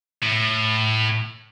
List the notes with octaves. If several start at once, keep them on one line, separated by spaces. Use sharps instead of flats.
A2